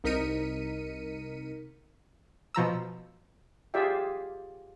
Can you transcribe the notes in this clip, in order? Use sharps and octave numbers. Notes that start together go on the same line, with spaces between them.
C2 D#4 A#4 B6 C#7 D#7
B2 F3 A#5 E6
F4 G4 G#4 D5 E5 G5